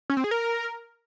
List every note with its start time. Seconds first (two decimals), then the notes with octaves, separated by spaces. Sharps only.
0.10 C#4
0.17 C4
0.24 G#4
0.31 A#4